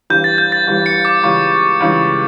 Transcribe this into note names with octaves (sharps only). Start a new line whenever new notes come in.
G1 G2 E3 G3 G6
A6
G6
A6
G1 G2 E3 G3
C#7
D6
C#2 C#3 E3 G3 C#6
C#2 C#3 E3 G3